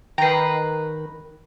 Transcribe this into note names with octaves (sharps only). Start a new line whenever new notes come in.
D#3 B4 G5 A#5 C7